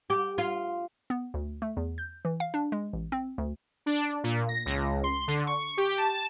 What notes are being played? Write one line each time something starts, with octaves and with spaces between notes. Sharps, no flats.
G4
F4
B3
D2
A3
E2
G6
E3
F5
D4
G#3
A1
C4
D2
D4
A#2
A#6
C#2
C6
D3
C#6
G4
A5